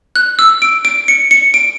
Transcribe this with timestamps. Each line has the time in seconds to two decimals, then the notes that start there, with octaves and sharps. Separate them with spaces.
0.15 F#6
0.39 E6
0.62 D7
0.85 D7
1.08 C#7
1.31 C#7
1.54 D7